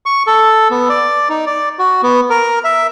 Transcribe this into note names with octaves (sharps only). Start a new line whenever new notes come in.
C#6
A4
B3
D5
D#4
D5
F#4
B3
A#4
E5